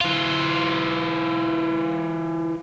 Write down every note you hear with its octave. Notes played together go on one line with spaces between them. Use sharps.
E3 F4